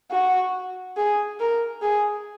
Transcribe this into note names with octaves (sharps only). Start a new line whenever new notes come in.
F#4
G#4
A#4
G#4